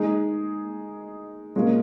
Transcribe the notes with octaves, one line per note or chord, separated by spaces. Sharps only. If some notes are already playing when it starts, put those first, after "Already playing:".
Already playing: G#3 D#4 G#4
A#2 G#3 C#4 F4 A#4